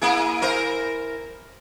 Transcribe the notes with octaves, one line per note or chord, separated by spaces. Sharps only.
A#3 E4 G#4
E4 A#4 C5